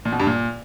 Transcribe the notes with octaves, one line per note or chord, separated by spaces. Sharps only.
A#2
B2
G2
A#2